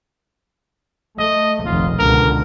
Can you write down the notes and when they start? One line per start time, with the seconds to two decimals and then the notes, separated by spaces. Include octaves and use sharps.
1.19 A3 D#5
1.66 F1 A#1 D#2 F4
1.99 C#2 B2 D3 A#4